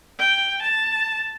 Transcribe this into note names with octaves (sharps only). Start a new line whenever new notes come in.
G5
A5